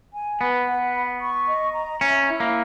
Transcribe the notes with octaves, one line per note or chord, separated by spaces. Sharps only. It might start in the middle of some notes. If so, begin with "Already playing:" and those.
G#5
B3 B4
F#5
B5
C#6
D#5
A#5
C#4 E5
E4
A#3